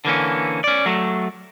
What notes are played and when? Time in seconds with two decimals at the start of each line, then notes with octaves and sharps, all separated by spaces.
0.05 D3 E3 A#3 C#4
0.64 C#4 D5
0.86 F#3 A3